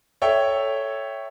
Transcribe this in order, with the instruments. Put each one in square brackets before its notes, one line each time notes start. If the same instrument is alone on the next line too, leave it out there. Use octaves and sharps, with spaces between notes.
[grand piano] A4 C#5 E5 G5